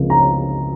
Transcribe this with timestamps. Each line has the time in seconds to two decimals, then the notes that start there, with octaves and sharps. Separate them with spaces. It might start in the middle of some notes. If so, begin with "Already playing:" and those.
Already playing: C#2 C3 F3 A#3
0.10 A#5